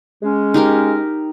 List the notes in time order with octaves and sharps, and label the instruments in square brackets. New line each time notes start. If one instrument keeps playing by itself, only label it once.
[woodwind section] G#3 C#4
[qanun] D#4 G4 A#4